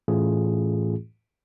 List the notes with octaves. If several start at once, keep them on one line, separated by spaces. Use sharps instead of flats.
A2 E3 A3 C#4 F4 G#4